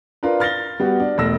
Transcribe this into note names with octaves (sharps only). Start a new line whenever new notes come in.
D4 F4 A#4 B4
F6 A6 A#6 G7
G3 B3 F#4
D4
E1 A3 E6 A#6